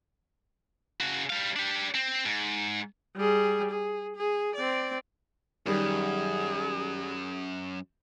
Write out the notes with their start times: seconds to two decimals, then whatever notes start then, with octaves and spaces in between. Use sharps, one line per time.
1.00 C#3 F#4
1.30 G3 F5
1.56 D4 G4
1.95 C4
2.26 G#2
3.16 G3 G#4
3.71 G#4
4.16 G#4
4.55 C4 D5
5.66 F#2 D#3 G3 G#4